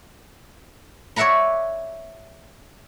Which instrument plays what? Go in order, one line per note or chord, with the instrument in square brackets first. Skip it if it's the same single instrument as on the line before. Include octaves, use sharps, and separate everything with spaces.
[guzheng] C#5 D5 E5 F#5 A#5 B5